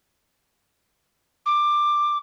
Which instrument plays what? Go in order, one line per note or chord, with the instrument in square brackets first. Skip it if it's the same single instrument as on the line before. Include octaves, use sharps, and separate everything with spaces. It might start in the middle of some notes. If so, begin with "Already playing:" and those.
[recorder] D6